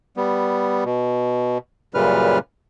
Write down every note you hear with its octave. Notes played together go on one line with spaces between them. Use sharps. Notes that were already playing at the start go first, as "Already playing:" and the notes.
G3 B3
B2
F#2 A#2 C#3 G3 B4 F6